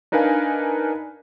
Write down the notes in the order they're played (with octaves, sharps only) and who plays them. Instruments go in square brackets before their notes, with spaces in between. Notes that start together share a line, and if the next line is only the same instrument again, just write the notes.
[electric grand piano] D4 D#4 A#4 B4 F5 G#5